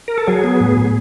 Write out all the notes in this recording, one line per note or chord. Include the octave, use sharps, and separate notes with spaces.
A#4
A4
F#3 G#4
B3
A2
A2